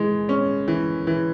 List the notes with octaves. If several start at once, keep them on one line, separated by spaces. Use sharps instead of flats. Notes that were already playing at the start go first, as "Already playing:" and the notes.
Already playing: E3 G#3
C#4
E3
E3